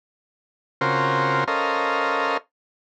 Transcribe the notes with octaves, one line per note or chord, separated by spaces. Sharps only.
C#3 C4 F4 F#4 A#4 C5
C#4 A4 A#4 C5 D#5 F5